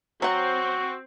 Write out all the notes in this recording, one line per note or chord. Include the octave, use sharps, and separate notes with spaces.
F#3 C4 F#4 F#5